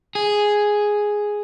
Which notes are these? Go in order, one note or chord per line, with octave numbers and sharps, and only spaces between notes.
G#4